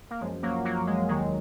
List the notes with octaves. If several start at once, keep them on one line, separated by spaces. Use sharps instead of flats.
A#3
F#2 F3 G#3
F#3 A#3
F#3 A#3
G#3
D#2 D#3 F#3 G#3